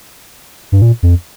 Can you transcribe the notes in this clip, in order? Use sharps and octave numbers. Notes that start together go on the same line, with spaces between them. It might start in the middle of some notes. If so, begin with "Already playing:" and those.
G2
A#2
F2